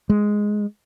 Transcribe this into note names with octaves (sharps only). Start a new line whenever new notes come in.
G#3